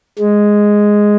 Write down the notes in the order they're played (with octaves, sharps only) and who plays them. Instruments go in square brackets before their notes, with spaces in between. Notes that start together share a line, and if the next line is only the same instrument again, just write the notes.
[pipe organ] G#3